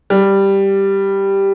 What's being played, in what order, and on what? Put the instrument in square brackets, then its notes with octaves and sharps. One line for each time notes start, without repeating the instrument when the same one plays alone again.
[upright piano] G3